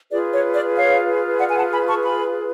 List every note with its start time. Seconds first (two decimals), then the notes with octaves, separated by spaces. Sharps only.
0.11 F4 G#4 B4 D5
0.32 C#5
0.53 D5
0.75 C#5 F5
1.39 D5 F#5
1.49 G#5
1.55 F#5 A5
1.72 G#5 B5
1.88 A5 C#6
2.03 G#5 B5